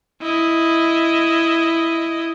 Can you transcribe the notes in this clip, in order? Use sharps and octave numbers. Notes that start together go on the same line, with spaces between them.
E4 D#5